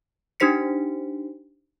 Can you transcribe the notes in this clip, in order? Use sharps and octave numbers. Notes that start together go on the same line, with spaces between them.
D4 D#4 G4 C5 B6 C#7